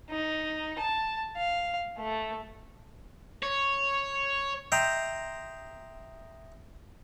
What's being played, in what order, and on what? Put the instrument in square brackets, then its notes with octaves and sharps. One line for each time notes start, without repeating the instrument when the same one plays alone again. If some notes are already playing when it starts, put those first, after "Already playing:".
[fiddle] D#4
A5
F5
A3
[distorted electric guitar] C#5
[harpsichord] D#5 E5 G5 A#5 C6